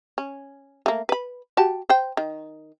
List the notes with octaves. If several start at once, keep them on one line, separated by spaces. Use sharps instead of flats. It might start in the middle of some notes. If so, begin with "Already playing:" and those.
C#4
A3 A#3
B4 B5
F#4 G4 A5
C5 G5
D#3